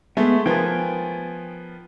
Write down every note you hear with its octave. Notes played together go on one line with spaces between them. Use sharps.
G#3 A3 B3
F3 B3 A#4 G5 G#5